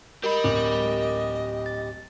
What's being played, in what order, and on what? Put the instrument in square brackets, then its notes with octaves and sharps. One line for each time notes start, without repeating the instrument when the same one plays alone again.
[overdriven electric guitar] G4 B5 [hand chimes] A#4 [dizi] D#5
[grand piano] D1
[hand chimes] A6